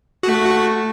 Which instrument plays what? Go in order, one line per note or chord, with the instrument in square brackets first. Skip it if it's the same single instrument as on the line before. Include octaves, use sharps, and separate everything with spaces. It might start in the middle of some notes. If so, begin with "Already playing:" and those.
[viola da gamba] A3 [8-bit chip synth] F#4